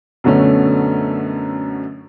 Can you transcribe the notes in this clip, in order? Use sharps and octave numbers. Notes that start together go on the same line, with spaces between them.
F#2 B2 D3 A3 C#4